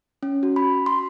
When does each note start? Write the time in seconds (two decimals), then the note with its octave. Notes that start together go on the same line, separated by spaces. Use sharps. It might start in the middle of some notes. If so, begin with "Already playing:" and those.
0.23 C#4
0.43 F#4
0.56 B5
0.86 C6